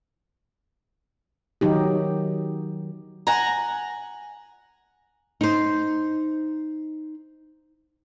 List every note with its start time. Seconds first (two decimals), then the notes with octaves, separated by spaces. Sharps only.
1.61 D#3 F#3 D#4 G4
3.27 F#5 G#5 A#5
5.41 D#4 C5